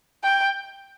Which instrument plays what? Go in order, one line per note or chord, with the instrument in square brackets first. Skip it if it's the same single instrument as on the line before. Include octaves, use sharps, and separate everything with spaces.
[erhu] G5